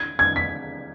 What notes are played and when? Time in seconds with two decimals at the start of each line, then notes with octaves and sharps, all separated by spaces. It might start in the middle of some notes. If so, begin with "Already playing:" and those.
Already playing: G#6
0.19 G#6
0.36 B6